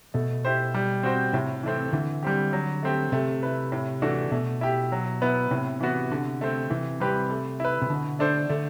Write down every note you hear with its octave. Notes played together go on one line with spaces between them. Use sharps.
B2 A3
E4 G4 C5
G3
C4 F#4 C5
A2 C3
E3 A3 C4
D3 E3
G3 C4 G4
F#3
A3 C4 G4
C3 A3
E4 B4
A2
E3 A3 D4 F#4
B2 A3
E4 G4
F#3
B3 E4 B4
A2 C3
E3 B3 F#4
D3
A3 C4
C3 E3
G3 C4 G4 B4
A3
E4 B4
C3
B2 D3
A3 D4 A4 C5
D3 A3